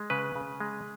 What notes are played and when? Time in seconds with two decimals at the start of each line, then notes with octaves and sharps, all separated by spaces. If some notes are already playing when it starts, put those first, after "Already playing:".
Already playing: G#3
0.10 C#3 B4
0.35 C#3
0.60 G#3